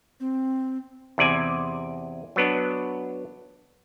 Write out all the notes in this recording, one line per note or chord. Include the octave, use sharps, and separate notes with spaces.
C4
E2 C3 D5 G#5
F#3 B3 D4